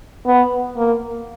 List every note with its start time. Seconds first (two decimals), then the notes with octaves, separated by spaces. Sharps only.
0.26 B3
0.76 A#3